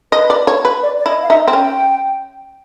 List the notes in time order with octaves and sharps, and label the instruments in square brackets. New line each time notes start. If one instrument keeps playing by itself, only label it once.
[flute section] B4 [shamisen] D#5
[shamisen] D5
C#5
B4
[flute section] D5
D5
[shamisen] E4 [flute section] D#5
[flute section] F5
[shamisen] D#4 [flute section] E5
[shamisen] C4
[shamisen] C#4 [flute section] G5